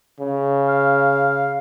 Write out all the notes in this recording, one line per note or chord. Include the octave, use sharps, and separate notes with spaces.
C#3
F5